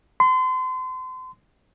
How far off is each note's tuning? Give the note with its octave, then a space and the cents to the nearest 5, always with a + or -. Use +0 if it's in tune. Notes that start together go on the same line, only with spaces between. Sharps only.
C6 -35